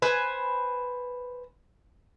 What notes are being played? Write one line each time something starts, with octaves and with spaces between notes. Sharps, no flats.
B4 C5 G#5